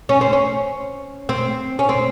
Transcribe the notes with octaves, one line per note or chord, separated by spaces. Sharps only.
C#4
C4
C#4
C4
C#4
C4